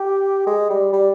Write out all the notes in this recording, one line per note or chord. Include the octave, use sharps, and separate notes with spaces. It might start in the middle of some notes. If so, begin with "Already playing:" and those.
Already playing: G4
G#3
G3
G3